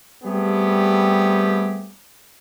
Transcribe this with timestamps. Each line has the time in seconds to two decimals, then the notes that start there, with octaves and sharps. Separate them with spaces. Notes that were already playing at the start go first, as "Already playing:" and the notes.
0.24 G3 A3 B3 C4 G4 G#4